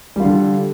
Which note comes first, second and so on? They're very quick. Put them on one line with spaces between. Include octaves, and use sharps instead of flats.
G3 F4 D3